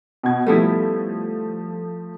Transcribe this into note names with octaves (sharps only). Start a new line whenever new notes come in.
B2 G#6
F3 G3 A3 B3 E4